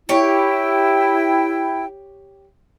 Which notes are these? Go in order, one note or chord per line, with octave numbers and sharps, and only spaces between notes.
E4 G4 C#5 G5